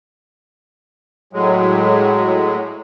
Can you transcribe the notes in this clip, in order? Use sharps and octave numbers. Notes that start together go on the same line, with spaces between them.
A2 F#3 G#3